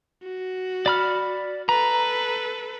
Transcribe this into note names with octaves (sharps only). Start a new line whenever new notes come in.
F#4
D5 B5 F6
A4 B4 A#5